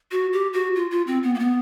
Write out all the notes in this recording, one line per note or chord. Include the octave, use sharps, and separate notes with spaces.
F#4
G4
F#4
F4
F4
C4
B3
A#3
B3